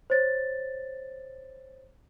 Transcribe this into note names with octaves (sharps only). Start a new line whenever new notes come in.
C5 C#5 A6